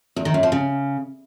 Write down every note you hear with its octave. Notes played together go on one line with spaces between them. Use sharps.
E2
D#3
F#2
F3
C#3